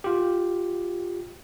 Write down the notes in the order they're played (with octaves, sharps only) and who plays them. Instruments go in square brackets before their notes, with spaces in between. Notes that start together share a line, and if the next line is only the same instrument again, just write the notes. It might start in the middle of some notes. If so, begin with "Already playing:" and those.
[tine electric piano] F4 G4